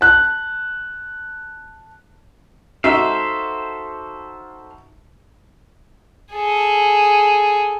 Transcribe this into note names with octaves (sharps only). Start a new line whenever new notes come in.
A5 F#6
D#4 F#4 A4 C5 E5 F5
G#4 A4